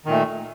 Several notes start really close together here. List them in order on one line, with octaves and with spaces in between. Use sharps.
D#3 A#2 A3